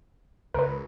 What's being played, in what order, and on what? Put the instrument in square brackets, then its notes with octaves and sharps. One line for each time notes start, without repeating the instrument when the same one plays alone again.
[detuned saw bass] C#2 [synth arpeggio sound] A#4 B4